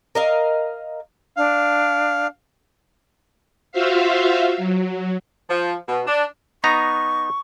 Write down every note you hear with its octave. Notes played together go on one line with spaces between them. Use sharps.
A#4 D#5 F5
D4 F5
F4 F#4 C5 E5 F5
F#3
F3
B2
D4
B3 D#4 A#5 C#6